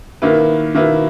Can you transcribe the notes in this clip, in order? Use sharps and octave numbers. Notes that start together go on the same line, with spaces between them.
D#3 A#3 E4 B4
D#3 A#3 E4 B4